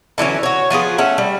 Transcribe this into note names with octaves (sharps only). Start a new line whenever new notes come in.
D3 E3 F#3 C#4
F#4 C#5
F3 B3 F4 G#4
A3 C#4 F#5
G3